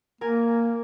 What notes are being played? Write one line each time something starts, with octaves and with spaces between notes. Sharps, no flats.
A#3 A#4 G#5